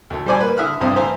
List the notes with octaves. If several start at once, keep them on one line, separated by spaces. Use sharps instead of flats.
D2 A3
G3 A4 C5 D5 G#5
A#3 B4
D3 E4 E5 D#6 F6 F#6
A1 G2 C3 C5 C6 D#6
E3 A3 C5 E5 F5 A#5